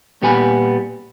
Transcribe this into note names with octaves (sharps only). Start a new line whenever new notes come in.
A#2 G3 B3 G4 G#5 B5